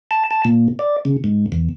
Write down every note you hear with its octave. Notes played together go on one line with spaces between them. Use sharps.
A5
A5
A#2
D5
C#3
G#2
E2